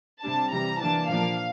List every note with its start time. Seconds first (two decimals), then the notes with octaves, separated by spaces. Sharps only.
0.23 C3 G3 D4 A5
0.51 C3 E3 G3 A#5
0.80 E3 A#3 D4 A5
1.09 A#2 F3 A#3 D4 F5